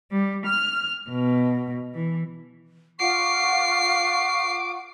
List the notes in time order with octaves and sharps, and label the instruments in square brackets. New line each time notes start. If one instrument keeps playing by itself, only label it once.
[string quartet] G3
F6
B2
E3
[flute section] F4 F#5 C#6 [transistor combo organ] D6 [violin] C7